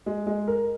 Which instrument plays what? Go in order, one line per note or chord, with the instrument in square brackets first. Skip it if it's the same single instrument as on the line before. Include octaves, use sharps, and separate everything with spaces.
[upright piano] G#3
G#3
A#4